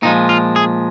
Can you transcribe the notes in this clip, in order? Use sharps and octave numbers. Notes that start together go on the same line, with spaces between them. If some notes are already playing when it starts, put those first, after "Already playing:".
A#2 F3 G#3 D#4
F4
G#4